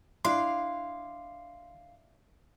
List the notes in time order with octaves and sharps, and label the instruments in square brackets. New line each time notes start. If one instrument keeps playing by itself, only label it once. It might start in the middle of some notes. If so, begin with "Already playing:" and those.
[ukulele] D4 E4 [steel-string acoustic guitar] F5 [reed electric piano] C6